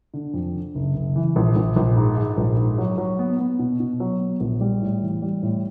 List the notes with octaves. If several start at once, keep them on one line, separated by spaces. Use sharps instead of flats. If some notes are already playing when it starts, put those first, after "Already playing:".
D3
F2
D3
F#1
F#1
E3
A#1
A#1
A#1
G#2
G#2
A#1
G#2
F#3
F#3
B3
B3
B2
B2
F#3
B3
A#1
G3
A2
E3
G3
A2